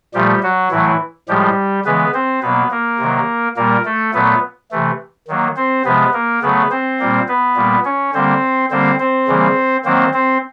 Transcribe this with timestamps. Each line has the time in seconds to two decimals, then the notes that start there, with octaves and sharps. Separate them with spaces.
0.14 A#2 F3 G3 A3 G4
0.43 F#3 F#4
0.71 A2 E3 F#3 A3 E4
1.28 A2 F3 G3 G#3 G4
1.85 C#3 E3 G#3 B3 B4
2.14 C4 C5
2.42 B2 F#3 A#3 B3 B4
2.71 A#3 A#4
2.99 C3 D#3 F#3
3.56 A#2 G3 A#3 A#4
3.85 A3 A4
4.13 A#2 F#3 A3 B3 B4
4.71 C3 E3 A3
5.28 D#3 F#3 A#3
5.56 C4 C5
5.85 C3 F3 G#3 B3 B4
6.14 A#3 A#4
6.42 C#3 F#3 A3 B3 B4
6.71 C4 C5
7.00 A#2 G3 A#3
7.28 B3 B4
7.56 A#2 G3 A#3
7.85 C#4 C#5
8.14 D3 G3 A#3 C4 C5
8.71 D3 G3 A#3 C4 C5
8.99 C4 C5
9.28 C#3 E3 G3 A#3
9.85 D#3 F#3 A#3 C4 C5
10.14 C4 C5